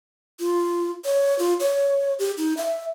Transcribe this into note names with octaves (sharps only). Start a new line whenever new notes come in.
F4
C#5
F4
C#5
G4
D#4
E5